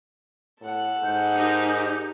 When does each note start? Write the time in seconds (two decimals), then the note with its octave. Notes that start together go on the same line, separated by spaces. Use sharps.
0.60 A2 A4 F#5
1.04 G#2 G6
1.37 D#4 G4 A#4